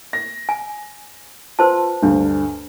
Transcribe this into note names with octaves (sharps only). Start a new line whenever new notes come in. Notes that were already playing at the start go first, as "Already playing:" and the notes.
A#6
G#5
F4 B4 C5 A5
D2 G2 D3 D4